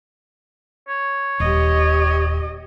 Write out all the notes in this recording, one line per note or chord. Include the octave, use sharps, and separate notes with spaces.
C#5
D#1 G4 D#5